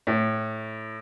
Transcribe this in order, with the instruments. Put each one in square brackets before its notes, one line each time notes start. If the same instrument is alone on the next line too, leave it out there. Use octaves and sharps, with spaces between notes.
[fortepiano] A2